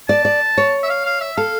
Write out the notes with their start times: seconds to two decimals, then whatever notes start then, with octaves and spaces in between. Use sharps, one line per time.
0.08 D5 A5
0.25 D5
0.58 C#5
0.83 E5
0.90 F5
1.05 F5
1.21 E5
1.37 A4 F5